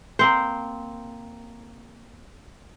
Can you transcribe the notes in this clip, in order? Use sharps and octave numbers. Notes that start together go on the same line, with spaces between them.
A#3 C4 C5